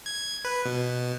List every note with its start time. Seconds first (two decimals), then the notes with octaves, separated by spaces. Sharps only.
0.06 G#6
0.45 B4
0.65 B2